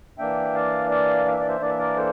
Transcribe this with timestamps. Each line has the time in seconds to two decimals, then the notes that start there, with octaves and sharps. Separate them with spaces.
0.18 E3 A#3 D4 E5 G5
0.54 D5 F5
0.90 D5 F5
1.26 F5
1.32 E5
1.40 D5
1.47 C5 E5
1.60 E3 A#3 D4 D5
1.70 E5
1.79 A#4 D5
1.97 A4 C5